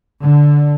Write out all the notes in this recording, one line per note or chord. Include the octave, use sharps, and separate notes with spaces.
D3